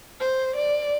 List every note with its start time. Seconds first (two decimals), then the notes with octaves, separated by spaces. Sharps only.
0.20 C5
0.56 D5